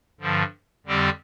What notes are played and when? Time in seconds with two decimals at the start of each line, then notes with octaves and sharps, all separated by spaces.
0.20 G2 D3 F3
0.86 F2 D3 G3 C4 G4